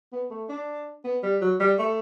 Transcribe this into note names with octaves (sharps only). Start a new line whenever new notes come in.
B3
A3
D4
B3
G3
F#3
G3
A3